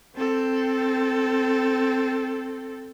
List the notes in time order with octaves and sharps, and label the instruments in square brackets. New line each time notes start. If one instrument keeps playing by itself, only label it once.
[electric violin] C4 A4